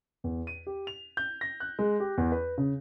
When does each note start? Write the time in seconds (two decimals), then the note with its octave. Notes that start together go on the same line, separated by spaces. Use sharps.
0.24 E2
0.47 D#7
0.67 G4
0.87 F7
1.17 G6
1.41 A#6
1.60 F#6
1.79 G#3
2.00 G4
2.17 E2
2.32 B4
2.58 C#3